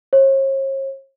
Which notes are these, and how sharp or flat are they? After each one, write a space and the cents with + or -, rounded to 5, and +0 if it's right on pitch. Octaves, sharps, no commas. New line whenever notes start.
C#5 -45